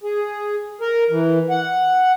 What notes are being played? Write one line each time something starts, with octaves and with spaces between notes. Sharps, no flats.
G#4
A#4
E3
F#5